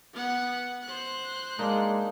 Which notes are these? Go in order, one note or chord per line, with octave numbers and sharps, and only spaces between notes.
B3 F#5
C5 F#6
G#3 A#3 D4 D#4